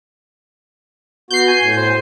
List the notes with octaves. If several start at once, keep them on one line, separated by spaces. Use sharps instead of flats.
B3 F#4 G6 C7
G#5
A2
C5